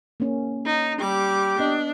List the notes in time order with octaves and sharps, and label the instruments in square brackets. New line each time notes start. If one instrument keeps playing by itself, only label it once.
[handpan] A#3 C#4
[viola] D#4
[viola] G3 D6 [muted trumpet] G4
[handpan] B3 D#5 [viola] D4